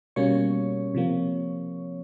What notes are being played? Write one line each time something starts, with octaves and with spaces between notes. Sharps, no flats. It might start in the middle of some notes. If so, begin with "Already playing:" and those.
B2 G3 A#3 C#4 C#5 C#6
C3 F3 A#3